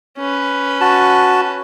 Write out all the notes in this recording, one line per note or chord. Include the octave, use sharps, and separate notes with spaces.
C#4 B4
F#4 A5